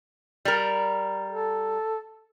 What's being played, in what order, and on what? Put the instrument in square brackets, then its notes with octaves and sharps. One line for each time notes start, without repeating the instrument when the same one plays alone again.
[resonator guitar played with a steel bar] G3 A#4
[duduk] A4